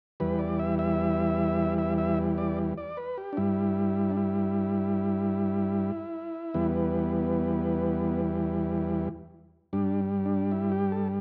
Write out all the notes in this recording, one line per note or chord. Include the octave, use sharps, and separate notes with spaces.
E2 E3 G3 B4
D5
E5
E5
E5
E5
D5
D5
B4
G4
D4
G2 G3 E4
D4
E4
E2 E3 G3 B3
G2 G3 D4
D4
E4
G4
A4